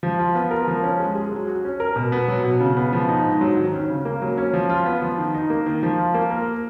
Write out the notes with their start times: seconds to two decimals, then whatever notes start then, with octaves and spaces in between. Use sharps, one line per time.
0.03 F3
0.19 F4
0.35 B3
0.51 A#4
0.68 F3
0.83 C#4
1.00 G#3
1.15 G#4
1.32 F#3
1.48 F#4
1.64 C#4
1.80 A#4
1.96 B2
2.12 B3
2.28 F#3
2.44 B2
2.61 C#3
2.77 B3
2.93 F3
3.09 D#4
3.25 G#2
3.41 F#3
3.57 D#3
3.73 C#4
3.90 C#3
4.05 A#3
4.22 F#3
4.38 C#4
4.53 F3
4.70 F4
4.86 B3
5.02 F3
5.18 D#3
5.34 D#4
5.50 A#3
5.66 D#3
5.83 F3
5.98 F4
6.14 A#3
6.31 A#4